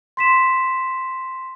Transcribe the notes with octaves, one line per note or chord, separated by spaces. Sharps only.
C6 B6 E7